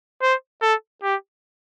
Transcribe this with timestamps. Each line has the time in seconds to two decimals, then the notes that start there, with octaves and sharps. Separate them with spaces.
0.22 C5
0.62 A4
1.03 G4